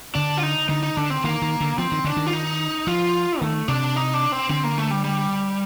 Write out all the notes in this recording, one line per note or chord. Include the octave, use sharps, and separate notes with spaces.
D3 D4
F4
D#4
D3 D#4
D#4
D3 D4
C4
D#3 A#3
D#3
D3
F3 C4
D#3
D3 D4
D#3
F4
D#4
F3 F4
D#3 A3
C3 D4
D#4
D4
C4
D3 C4
A#3
A3
G3
G3